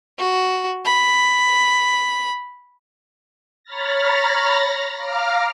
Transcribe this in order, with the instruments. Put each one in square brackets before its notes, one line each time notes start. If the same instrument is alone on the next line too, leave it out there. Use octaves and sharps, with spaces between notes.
[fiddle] F#4
B5
[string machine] C#5 A#5 B5 F6 A6 A#6
F5 A#5 D6 F6